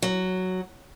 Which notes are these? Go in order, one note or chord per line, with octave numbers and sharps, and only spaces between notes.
F#3